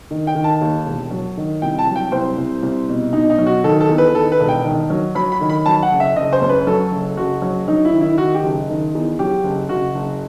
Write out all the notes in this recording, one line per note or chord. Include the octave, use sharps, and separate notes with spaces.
D#3
G5
D#3
A5
D#2
E1
F#3
D#3
C2 G5
A5
F#3
G5
C2 C5
C2
C2
B2
B2 D#4
D#4
F#3
F#4
D#3 A4
A4
E2
B4
D#3 A4
B4
E1
G5
D#3
F#3
F#3 B5
B5
D#3
B5
F#3 A5
F#5
F#1
E5
F#1 D#5
C5
F#2
B4
F#3 A4
F#1
F#1 F#4
F#3
F#3 D#4
E4
D#3
E4
D#3 F#4
G4
F#1
D#3
E2
F#3 G4
F#1
F#1 F#4
F#1